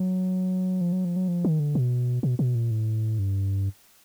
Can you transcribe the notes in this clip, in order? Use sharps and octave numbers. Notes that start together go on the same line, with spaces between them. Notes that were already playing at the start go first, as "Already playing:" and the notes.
Already playing: F#3
F3
F#3
F3
F#3
F3
D#3
D3
B2
B2
B2
A#2
A2
G2